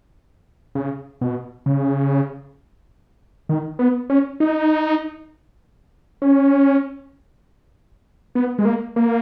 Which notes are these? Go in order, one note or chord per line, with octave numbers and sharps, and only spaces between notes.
C#3
B2
C#3
D#3
B3
C#4
D#4
C#4
B3
G#3
A#3
A#3